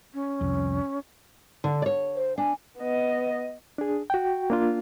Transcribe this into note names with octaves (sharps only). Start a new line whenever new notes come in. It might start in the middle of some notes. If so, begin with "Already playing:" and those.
C#4
C2 F2
D3
C#5 D5
C5
D4 G#5
B3 D#5
D4 G#4
F#4 G5
A#3 D4 F4